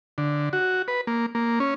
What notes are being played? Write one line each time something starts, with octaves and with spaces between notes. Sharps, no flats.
D3
F#4
B4
A#3
A#3
C#4